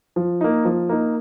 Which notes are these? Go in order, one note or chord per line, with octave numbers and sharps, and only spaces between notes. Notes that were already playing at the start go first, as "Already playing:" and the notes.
F3
A#3 D#4
F3
A#3 D#4